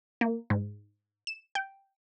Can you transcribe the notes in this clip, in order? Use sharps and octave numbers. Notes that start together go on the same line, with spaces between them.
A#3
G#2
E7
G5